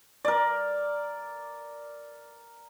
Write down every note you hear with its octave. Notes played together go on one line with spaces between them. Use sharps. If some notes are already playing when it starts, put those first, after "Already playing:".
A#4 D5